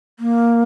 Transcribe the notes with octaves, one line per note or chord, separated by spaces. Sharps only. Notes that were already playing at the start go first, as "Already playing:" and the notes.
A#3